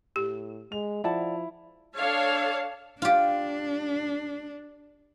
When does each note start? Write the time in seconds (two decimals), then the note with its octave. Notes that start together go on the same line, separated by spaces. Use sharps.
0.16 A2 G4
0.72 G#3 F7
1.04 F3 E4 D5 F#5 A5
1.97 D4 A4 C#5 F5 A5
3.02 D4 F4 G4